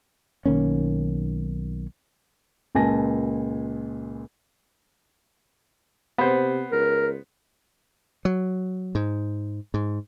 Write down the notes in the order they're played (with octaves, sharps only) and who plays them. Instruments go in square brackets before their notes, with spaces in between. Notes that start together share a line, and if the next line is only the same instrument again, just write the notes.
[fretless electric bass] B1 D#3 A#3 C#4
[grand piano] C#2 A#2 G#5 A5 A#6
[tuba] C3 [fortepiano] B3 C5
[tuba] C#2 [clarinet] A#4
[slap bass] F#3
G#2
G#2